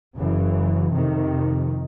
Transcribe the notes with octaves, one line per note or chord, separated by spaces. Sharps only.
F#1 F#2 C#3 E3
F2 C3 D#3